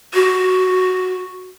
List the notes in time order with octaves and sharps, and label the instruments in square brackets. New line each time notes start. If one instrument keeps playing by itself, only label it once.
[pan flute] F#4